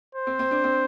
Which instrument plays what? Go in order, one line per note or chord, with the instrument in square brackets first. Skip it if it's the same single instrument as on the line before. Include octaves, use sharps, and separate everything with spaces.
[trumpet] C5
[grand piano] C4
C4
D4
C4